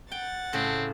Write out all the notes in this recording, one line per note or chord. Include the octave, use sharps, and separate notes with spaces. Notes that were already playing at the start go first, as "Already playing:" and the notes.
F#5 G5 A6
A2 C#3 C4 A4